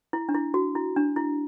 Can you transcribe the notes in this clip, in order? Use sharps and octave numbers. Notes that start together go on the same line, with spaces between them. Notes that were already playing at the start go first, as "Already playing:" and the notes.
E4
D4
E4
F#4
E4
D4
E4